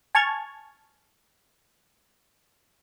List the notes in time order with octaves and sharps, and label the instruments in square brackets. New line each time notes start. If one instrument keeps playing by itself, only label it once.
[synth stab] G#5 A5 C#6 F6 G#6